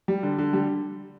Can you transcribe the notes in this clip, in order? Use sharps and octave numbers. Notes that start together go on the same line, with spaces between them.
G3
D3
D3
G3